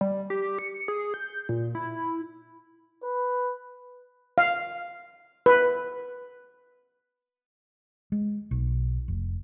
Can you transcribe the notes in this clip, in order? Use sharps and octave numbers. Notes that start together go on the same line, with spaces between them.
G3
G4
C#7
G#4
G6
A#2
E4
B4
F5
B4
G#3
B1
F1